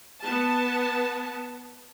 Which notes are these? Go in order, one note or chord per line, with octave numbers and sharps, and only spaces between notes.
B3 A5